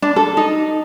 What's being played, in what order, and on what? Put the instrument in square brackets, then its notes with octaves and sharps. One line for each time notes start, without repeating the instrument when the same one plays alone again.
[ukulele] D4
A4
D#4